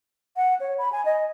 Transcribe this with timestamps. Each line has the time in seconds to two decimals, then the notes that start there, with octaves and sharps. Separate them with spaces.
0.36 F#5
0.60 C#5
0.78 B5
0.92 G#5
1.05 D#5